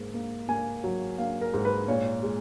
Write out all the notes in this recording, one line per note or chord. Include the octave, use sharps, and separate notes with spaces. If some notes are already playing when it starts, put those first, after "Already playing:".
Already playing: G#2 A#3
A#3
A#3 G#5
F#3
A#3 F5
A#4
G#2
B4
A#2 C#5
G#3